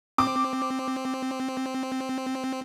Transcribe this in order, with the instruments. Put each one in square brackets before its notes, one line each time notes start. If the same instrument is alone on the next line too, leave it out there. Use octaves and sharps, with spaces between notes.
[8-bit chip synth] C4 [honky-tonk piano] D6